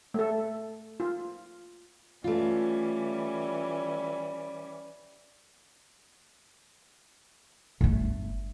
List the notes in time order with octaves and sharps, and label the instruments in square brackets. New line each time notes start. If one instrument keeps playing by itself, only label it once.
[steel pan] A3 A4
F4
[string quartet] E3 G3 C#4 [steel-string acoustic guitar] A3 F4
[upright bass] G1 A3